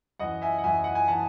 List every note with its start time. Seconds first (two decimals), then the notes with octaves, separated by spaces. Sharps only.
0.19 F#2 E3 D#5 F#5
0.42 E5 G#5
0.58 F#5
0.64 F#2 E3 E5 G#5
0.84 F#5
0.95 G#5
1.08 E3 F#5 A5